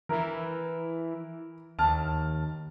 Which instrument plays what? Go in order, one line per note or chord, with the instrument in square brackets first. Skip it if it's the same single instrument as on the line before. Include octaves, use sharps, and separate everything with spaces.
[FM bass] E3 [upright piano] E4 A#4
[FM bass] D#2 [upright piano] A5 F6